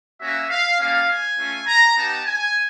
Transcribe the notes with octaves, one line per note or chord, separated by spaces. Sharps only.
A#3 C#4 F#4 E5
F5
G3 A#3 C#4 F5
G#5
A3 C#4 F4
A#5
B3 D#4 G4 A5
G#5